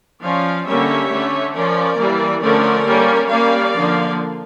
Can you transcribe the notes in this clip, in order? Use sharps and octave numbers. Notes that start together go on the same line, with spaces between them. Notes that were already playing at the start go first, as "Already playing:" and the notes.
F3 C#4 D5 F5
D3 G3 A#3 C#4 C#5 E5
D3 A3 C#4
F3 C#4 A#4 D5
E3 G3 A#3
D3 F3 A3 C#4 A#4 D5
G3 A#3 C#4
G3 A#3 C#4 D5 F5
D3 F3 A#3